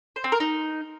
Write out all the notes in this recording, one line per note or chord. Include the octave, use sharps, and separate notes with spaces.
C5
C4
A#4
D#4